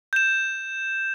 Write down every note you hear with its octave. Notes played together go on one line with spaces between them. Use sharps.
G6 E7